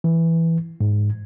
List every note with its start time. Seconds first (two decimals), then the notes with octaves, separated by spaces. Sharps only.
0.04 E3
0.80 G#2